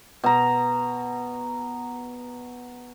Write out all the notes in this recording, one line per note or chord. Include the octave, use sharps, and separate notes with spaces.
B2 A#5